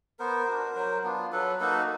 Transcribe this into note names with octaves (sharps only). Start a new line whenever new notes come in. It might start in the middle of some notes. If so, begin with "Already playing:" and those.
B3 A#4 C5
D4 F#4
F#3
B3 D4 F4
F#3 A4 B4
A#3 D#4 F#4 A4 B4